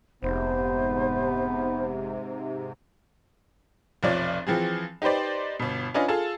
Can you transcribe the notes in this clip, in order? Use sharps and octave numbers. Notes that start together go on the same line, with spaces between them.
F1 G#2 C3 B3 C5
F1 B1 F3 C#5 D5 A6
E3 F3 C4 G#4
D#4 G4 B4 C5 D5
G1 B2
C#4 D4 F4 B4 D#5 G#5
F4 G#4 A4 A5